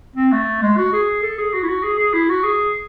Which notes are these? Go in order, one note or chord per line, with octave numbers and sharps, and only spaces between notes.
C4
A3
G#3
F#4
G#4
A4
G#4
F#4
E4
F#4
G#4
G#4
E4
F#4
G#4